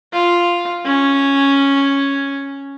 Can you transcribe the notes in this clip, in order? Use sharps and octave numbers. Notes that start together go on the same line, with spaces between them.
F4
C#4